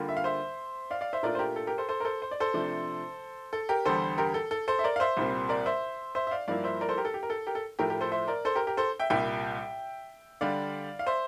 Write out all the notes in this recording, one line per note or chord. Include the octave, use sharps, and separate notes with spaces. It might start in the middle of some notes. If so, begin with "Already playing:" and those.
Already playing: D3 G3 A#3 F4
E5
F5
C5 E5
D5 F5
D5 F5
C5 E5
A#2 A3 D4 F4 A#4 D5
C5
G4 A#4
A4
G4 A#4
A4 C5
A4 C5
A#4
A4 C5
C5
D5
A4 C5
C3 F3 A3 D4
A4
G4 A#4
E2 D3 G3 A4 C5
G4 A#4
A4
A4
A4 C5
E5
A#4 D5
F5
C5 E5
C2 A#2 G3 C4
A#4 D5
C5 E5
C5 E5
E5
D5 F5
G2 F3 A#3 E4 D5 F5
C5 E5
A#4 D5
A4 C5
G4 A#4
A4
G4
A#4
A4
G4 A#4
A4
A2 F3 A3 G4 A#4
G4 A#4
A4 C5
C5 E5
A#4 D5
A4 C5
G4 A#4
G4 A#4
A4 C5
E5 G5
C2 A#2 G3 E5 G5
D3 G3 D4 D5 F5
F5
C5 E5